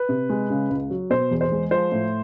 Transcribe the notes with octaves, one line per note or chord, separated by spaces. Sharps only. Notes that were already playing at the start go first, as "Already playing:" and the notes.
Already playing: B4
C3
G#3
C#3
C#2
F#3
B2 C5
E2
C5
G#3
F3 C5
A2